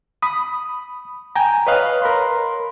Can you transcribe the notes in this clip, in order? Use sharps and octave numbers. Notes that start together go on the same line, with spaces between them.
B5 D#6
G5 G#5 A#5
B4 C#5 D#5 F5 F#6
A#4 B5 C6